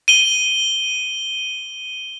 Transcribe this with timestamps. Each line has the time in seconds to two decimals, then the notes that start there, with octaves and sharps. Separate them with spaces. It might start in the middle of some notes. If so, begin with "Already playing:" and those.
0.08 D#7 G7